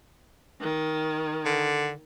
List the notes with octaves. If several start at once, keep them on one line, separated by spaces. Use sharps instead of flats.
D#3
D3